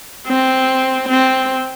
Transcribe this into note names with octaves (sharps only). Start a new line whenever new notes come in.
C4
C4